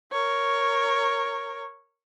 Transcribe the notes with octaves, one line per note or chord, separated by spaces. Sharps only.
A#4 C#5